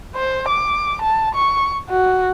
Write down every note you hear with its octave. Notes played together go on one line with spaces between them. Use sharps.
C5
D6
A5
C#6
F#4